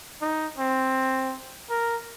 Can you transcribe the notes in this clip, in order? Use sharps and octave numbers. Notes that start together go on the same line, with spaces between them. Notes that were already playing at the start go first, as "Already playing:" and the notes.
D#4
C4
A#4